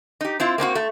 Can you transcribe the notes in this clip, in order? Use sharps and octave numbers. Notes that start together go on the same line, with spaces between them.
D#4 G4
C4 E4 F4
A#3 C4 D4 F#4
A3